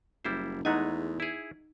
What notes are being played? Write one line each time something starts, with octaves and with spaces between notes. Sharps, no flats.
F#1 G3 E4 C5
E2 G#3 A3 D#4 F#5 G#5
E4 G#4